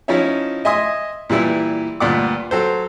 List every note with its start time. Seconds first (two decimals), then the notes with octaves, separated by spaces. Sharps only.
0.08 F3 C#4 D#4 E4 C#5 E5
0.65 D#5 E5 G#5 C6 D#6
1.30 A#2 E3 G3 E4
2.00 D2 G2 A#2 D5 F#5 D6
2.51 F#3 A4 C5